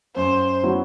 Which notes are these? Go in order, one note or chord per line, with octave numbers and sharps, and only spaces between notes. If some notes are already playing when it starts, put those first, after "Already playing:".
F#2 C5
F#3 B3 E4